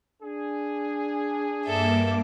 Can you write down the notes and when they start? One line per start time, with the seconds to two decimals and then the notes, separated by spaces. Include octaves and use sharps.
0.23 D4 G#4
1.66 G2 A#3 A4 E5 D6